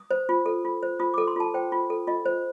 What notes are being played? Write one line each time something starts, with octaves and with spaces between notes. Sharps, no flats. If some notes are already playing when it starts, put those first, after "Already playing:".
Already playing: D#6
C5
F4
A4
F4
C5
F4 D#6
A4 D6
C6
F4 A5
C5 G5
F4
A4
F4 D#5
C5